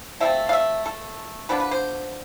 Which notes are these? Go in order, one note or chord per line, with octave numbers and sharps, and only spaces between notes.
F3 A3 C4 E5
F5
E5
A4
D3 F3 B3 D4 B4
B4
C5